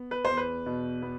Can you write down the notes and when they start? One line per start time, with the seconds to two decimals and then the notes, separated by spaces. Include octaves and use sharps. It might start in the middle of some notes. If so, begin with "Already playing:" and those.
Already playing: B3
0.11 B4
0.25 E2 C5
0.37 B4
0.66 B2
1.02 B3